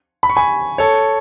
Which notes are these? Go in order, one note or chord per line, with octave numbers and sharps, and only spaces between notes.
B5
C#6
G#5 B5
A4 C#5